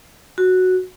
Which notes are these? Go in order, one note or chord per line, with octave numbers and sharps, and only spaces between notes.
F#4